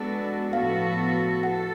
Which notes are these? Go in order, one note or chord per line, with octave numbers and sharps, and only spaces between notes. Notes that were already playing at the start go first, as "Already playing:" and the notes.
Already playing: G#3 B3 D4 F#4 A4
A2 F3 B3 F#4 A4 F5
A4 F#5